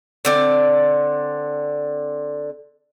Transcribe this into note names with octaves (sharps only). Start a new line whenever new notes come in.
D3 C4 D5